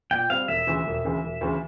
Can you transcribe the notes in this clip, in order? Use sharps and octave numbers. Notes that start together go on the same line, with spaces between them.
A#2 G5
G3 C4 F5
E1 E5
D2 C#3 E3
E1
D2 C#3 E3
E1
D2 C#3 E3